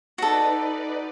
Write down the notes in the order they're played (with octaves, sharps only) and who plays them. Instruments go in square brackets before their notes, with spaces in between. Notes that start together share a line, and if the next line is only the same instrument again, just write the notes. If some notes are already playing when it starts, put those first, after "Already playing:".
[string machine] D#4 B4 D5 [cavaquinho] F#4 A4